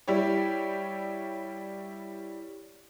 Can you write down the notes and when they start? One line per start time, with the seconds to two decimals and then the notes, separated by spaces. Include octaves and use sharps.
0.08 G3 E4 G4 C#5